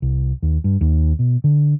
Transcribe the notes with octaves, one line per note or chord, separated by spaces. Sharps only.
C2
D#2
G2
D#2
B2
D3